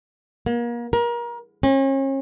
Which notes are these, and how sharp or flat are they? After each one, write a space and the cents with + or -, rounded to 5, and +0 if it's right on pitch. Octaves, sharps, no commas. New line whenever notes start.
A#3 +35
A#4 +30
C#4 -40